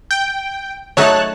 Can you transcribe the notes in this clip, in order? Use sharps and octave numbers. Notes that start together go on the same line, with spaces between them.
G5
F#3 A3 D#4 C#5 A5 F#6